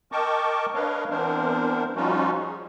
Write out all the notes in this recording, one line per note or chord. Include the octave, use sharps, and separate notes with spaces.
A#4 D#5 G5 A5 C#6 D6
D4 A#4 B4 C#5 D#5 F5
E3 B3 C4 D4 A#4 C5
F3 G3 C#4 D#4 F4 F#4
G#4